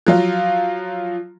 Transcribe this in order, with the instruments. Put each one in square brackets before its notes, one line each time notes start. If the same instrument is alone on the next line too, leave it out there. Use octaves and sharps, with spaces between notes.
[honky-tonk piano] F3 F#3 F4